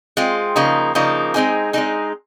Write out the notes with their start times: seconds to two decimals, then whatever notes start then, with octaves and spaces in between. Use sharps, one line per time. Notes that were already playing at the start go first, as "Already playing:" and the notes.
0.17 G#3 C4 F4
0.56 C#3 F3 A#3 D#4
0.95 C#3 F3 A#3 D#4
1.34 G#3 C4 D#4 G#4
1.73 G#3 C4 D#4 G#4